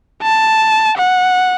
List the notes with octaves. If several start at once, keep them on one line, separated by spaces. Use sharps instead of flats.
A5
F#5